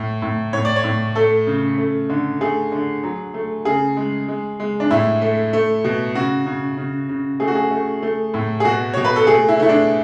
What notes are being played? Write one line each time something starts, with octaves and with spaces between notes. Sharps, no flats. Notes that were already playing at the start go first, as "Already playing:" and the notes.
Already playing: A2
A2
A2 C#5
D5
C#5
A2
A3 A4
C#3
A3
D3
A3 G#4
D3
F#3
A3
C#3 G#4
G#3
G#3
G#3
D4
A2 E4
A3
A3
B2
C#3 F#4
C#3
C#3
C#3
A3 G#4
F#4
G#4
A3
A3
A2
G#4
B2 F#4
B2 C#5
B4
A4
A3 G#4
E4
A3 E4
D4